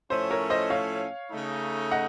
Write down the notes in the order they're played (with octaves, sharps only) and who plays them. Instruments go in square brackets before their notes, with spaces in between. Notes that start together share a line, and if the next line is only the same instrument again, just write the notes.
[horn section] A2 F3 A3 C#4 [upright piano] C5
[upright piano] A#4 C#5
C5 D#5
C#5 F5
[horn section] C#3 A3 D#4
[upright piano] D#5 F#5